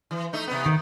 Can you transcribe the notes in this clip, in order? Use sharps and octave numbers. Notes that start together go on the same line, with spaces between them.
E3
A3 D#4
C3 B3
D#3